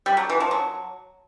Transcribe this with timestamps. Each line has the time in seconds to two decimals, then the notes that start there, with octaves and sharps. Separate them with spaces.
0.06 G3
0.17 F#3
0.30 E3
0.40 F3
0.51 F#3